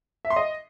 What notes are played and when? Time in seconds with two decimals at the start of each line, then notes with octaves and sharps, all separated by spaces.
0.25 E5
0.30 C6
0.36 D#5